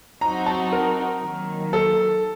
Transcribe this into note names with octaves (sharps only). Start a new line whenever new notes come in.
F#3 C4 D#4 F#4 A#5
A5
A#4
D#3 F#3 A#3
A4